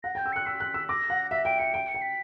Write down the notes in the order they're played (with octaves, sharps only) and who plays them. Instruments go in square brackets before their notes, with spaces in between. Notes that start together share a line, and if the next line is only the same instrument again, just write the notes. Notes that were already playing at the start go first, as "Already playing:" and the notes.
[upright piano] F#5 [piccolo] A#6
[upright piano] G5
[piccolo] G6
[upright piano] E6
[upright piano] F#6 [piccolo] C#7
[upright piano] E6 [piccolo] B6
[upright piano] F#6
E6
[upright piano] D6 [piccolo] A#6
[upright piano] F#5
[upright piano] E5 [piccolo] B6
[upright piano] G5 [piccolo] D7
[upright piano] G5 [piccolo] C#7
[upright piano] G5 [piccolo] D7
[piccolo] C#7
[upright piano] G5
[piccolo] B6